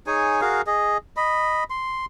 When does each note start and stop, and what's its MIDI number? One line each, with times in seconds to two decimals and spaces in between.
0.07 0.41 63
0.07 0.41 68
0.07 0.41 73
0.07 0.41 80
0.41 0.62 66
0.41 0.62 68
0.41 0.62 70
0.41 0.62 77
0.67 0.98 68
0.67 0.98 75
1.17 1.64 75
1.17 1.64 83
1.70 2.06 84